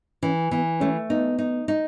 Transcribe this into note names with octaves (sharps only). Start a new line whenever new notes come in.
E3 C#4
E3 B3
A3 C#4
B3 D#4
D#4
D#4